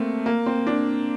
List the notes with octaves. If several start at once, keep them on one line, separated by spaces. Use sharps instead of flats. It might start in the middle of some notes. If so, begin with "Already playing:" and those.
Already playing: A3 A#3 C4
A#3
C4
D4